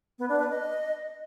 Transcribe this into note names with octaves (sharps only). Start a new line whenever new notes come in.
B3
D4
B4
D#5